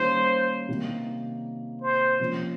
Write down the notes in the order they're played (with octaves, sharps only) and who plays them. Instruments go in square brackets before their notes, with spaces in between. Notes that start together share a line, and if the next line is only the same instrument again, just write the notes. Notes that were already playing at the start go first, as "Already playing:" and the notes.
Already playing: [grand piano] D#3 G3 A#3 C#4 [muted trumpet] C5
[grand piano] C3 D#3 A#3
[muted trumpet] C5
[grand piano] C3 F3 A#3 C#4